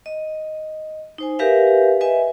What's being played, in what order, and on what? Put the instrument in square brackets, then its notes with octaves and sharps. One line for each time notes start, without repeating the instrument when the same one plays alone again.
[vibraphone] D#5
D#4 C5 G#5
G4 A#4 B4 E5 F5 G#5
B4 D#5 E5 G#5